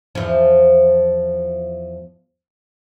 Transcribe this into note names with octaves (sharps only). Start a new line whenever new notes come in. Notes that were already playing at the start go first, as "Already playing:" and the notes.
E2 F3